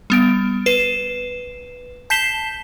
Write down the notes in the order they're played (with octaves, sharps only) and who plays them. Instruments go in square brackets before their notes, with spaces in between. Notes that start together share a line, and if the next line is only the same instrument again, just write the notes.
[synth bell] G3 B3 D7
B4 C7 E7
A5 G6 B6 C7 E7 G7